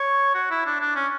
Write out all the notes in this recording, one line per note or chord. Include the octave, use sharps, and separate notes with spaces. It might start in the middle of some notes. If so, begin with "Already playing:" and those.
Already playing: C#5
F#4
E4
D4
D4
C#4